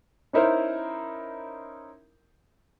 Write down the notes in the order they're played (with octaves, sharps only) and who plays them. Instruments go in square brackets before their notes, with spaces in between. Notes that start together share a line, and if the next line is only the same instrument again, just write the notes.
[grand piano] C#4 D#4 E4 A#4 C5